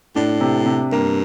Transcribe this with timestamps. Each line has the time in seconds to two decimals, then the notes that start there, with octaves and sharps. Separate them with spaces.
0.15 A2 D4
0.41 C3
0.66 C3
0.92 G2 A#3